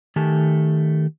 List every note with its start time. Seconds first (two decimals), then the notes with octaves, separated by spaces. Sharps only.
0.16 D#3 A3 G4 G#5 A5